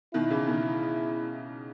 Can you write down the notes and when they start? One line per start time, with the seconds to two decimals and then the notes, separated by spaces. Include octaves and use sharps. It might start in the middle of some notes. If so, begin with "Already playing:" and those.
0.14 B2 D#3 E4
0.30 C#3 E3
0.47 B2 D#3